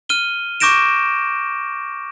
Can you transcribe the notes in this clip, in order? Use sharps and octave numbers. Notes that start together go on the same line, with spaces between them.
F6 D#7 G7
C#6 D6 G6 A#6 D7 E7